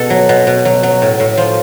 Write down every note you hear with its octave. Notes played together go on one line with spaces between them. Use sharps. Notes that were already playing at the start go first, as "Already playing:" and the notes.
Already playing: B2 A4
F#3
B2
B2
F#3
F#3
A2
A2
F3